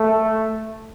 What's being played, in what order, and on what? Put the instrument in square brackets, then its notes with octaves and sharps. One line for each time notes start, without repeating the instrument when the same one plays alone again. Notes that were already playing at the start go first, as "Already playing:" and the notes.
Already playing: [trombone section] A3